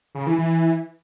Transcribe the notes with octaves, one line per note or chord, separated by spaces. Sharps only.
C#3
E3
E3